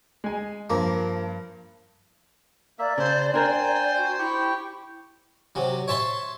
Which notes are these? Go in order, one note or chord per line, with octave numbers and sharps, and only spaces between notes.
G#3 G#5
G2 F3 A#3
A#3 D5 E5
C#3 C5 A5
D4 A#4 C5 G5 G#5 C6
F#4
E4 G4 G5 C#6
C3 F#3
C#5 E5 A5 C6